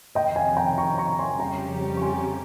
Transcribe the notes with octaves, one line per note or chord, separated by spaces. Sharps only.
F2 C3 D#3 D#5 G5
F5 G#5
G5 A#5
A#5 C#6
A#5 C#6
G#5 C6
F2 C#3 G3 C#4 G4 G5 A#5
C#6
G#5 C6